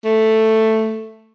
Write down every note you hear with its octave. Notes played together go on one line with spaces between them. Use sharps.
A3